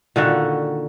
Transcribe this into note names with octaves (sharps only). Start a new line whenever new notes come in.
A#2 D3 D#3 F#4